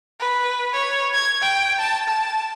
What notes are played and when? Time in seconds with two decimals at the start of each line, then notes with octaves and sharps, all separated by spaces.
0.20 B4
0.73 C#5
1.14 G#6
1.42 G5
1.79 A5
2.08 A5